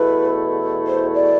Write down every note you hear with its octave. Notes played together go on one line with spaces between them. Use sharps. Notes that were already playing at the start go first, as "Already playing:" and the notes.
Already playing: E2 B2 A3 E4 B4
C5
D5